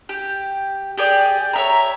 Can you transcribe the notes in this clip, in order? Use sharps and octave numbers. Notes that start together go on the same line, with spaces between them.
G4
G4 G#4 D5
C#5 E5 A#5